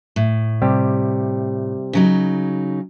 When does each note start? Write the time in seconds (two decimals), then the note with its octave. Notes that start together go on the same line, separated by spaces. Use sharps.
0.16 A2
0.62 C3 G3 G4
1.93 C#3 F#3 D#4